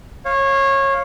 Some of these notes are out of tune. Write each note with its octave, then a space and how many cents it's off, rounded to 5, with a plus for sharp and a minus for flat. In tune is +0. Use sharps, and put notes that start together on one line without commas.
C#5 -20 F5 +0